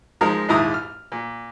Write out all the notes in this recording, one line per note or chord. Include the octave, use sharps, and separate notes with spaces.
F3 G#3 D#4 A#4
A#1 D#2 G#2 E4 A#5 D#6
F6
A#2